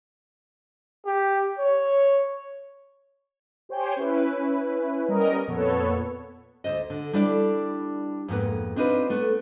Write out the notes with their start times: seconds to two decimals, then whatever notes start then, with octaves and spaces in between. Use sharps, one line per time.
1.06 G4
1.59 C#5
3.69 G4 C5 C#5 G5 G#5 G6
3.96 C#4 E4 B4
5.09 G3 B3 C#4 A#4 D#5
5.48 F2 A#2 B3 A4 B4 C#5
6.64 D2 C5 D#5
6.90 D3
7.13 G3 D4 E4 A4 D5
8.28 F2 G#2 A#3 B3
8.76 C4 D4 D#4 F4 B4
9.10 A3 B3